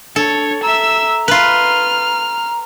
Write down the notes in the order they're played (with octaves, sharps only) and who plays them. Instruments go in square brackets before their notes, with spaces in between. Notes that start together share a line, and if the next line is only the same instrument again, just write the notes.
[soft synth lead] D4 [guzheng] A4 [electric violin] C#5
[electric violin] E5 E6 [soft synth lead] A#5
[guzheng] F4 B4 [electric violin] F6